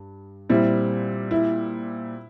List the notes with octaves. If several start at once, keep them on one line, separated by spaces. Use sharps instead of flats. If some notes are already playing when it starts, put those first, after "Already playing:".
Already playing: G2
A#2 G3 C4 E4
E4